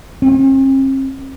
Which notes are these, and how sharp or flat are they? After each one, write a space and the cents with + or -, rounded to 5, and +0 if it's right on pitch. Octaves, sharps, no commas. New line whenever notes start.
C4 +45